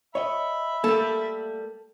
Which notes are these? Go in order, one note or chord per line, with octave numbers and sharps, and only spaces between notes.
C#5 D#5 E5 B5
G3 A3 A#3 A4